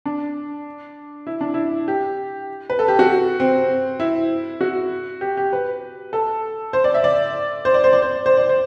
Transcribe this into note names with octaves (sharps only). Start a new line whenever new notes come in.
D4
E4
D4
E4
G4
B4
A4
G4
F#4
C4
E4
F#4
G4
G4
B4
A4
C5
D5
E5
D5
C5
D5
C5
D5
C5
C5
D5
C5